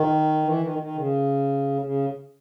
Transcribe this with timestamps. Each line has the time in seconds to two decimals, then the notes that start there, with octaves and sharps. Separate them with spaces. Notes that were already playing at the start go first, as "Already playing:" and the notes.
Already playing: D#3
0.44 E3
0.61 D#3
0.79 D#3
0.95 C#3
1.82 C#3